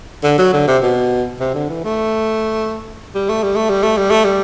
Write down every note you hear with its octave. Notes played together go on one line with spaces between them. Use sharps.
D3
F#3
D3
C3
B2
C3
D3
E3
A3
G3
A3
G3
A3
G3
A3
G3
A3
G3